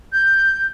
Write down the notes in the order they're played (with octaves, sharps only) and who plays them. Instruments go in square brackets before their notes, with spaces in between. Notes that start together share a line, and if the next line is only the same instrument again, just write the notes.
[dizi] G6